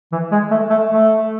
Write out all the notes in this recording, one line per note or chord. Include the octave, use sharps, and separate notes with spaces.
E3
G#3
A3
A3
A3